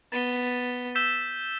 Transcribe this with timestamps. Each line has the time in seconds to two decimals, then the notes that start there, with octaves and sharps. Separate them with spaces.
0.12 B3 A6 D#7 G7
0.95 E6 G6 B6 E7 G7